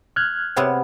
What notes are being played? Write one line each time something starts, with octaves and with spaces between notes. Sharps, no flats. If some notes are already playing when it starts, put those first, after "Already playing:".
F6 F#6 G#6
C3 B3 C4